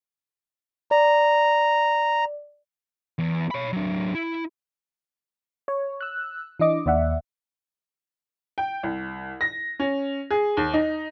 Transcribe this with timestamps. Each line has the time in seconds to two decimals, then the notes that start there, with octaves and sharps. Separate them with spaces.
0.91 D5 A#5
3.19 E2
3.51 C#5 B5
3.73 F#3 D4
4.15 E4
5.68 C#5
6.01 E6 F#6
6.60 E3 D4 D#5 D6
6.86 D#2 D5 E5 F#5
8.58 G5
8.83 C2
9.41 A#6
9.79 C#4
10.30 G#4
10.57 D#2
10.74 D#4